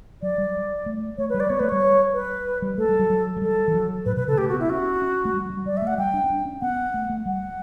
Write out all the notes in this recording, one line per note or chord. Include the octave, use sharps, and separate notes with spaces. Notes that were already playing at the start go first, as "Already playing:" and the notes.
F#3 D5
G3
A3
A3 C#5
B4
G3
D5
B3 C#5
A3 B4
G3 C#5
B4
G3
A3 A4
G3
F#3
F#3
F#3
G3 A4
E3
F#3
A2 B4
B2 B4
C#3 A4
A3 G4
F#4
B3
E4
C#4 F#4
C#4
A3
G3
G3
G3 D5
E5
A3 F#5
G3 G5
D4
C#4
D4
C#4
B3 F#5
A3
A3
G3 F#5